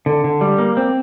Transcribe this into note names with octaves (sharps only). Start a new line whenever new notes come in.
D3
D3
G3
A#3
C4